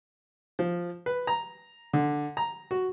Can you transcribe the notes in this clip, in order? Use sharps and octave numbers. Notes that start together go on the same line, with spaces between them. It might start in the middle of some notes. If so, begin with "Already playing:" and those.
F3
B4
A#5
D3
A#5
F#4